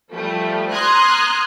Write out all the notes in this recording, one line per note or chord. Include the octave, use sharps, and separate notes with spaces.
F3 G3 A3
A#5 C6 D#6 F6 F#6 G#6